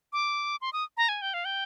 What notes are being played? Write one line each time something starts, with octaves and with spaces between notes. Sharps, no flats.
D6
C6
D#6
A#5
G#5
G5
F5
G5